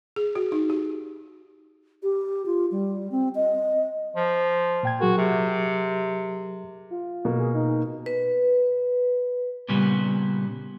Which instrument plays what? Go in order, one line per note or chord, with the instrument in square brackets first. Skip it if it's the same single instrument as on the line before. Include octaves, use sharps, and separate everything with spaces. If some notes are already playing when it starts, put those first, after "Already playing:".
[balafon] G#4
F#4
D#4
G4
[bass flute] G4
F4
G3
C4
D#5
[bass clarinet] F3
[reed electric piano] A#2 G5 G#6
[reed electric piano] F#3 G#4 A#4 [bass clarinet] F#4
[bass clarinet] C3
[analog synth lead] F4
[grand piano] B2 A#3
[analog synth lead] G#4
D#4
[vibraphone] B4
[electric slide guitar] A#2 C#3 G3 B3